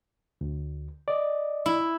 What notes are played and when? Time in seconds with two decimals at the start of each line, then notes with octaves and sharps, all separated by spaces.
0.41 D2
1.08 D5 D#5
1.66 E4